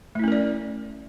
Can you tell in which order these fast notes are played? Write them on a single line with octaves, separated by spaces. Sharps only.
A3 E4 C#4 A#4 D5